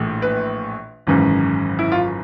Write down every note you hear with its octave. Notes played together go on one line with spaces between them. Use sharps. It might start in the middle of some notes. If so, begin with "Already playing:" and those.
Already playing: A#1 A2 E3
B4
G#1 F#2 C#3 E3
E4
F4